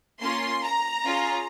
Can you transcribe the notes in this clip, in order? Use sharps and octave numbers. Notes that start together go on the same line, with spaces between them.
A#3 C#4 F4 C6
A#5
C#4 F4 G#4